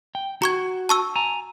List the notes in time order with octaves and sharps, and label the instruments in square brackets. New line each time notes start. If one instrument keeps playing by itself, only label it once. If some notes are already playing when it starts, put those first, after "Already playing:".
[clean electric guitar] G5
[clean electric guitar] F#4 [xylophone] A#5 C#6 G#6
[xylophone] A5 C#6 E6
[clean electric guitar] G#5 A#5